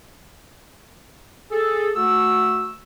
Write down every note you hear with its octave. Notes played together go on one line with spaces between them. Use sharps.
G#4 A4
A3 F#4 E6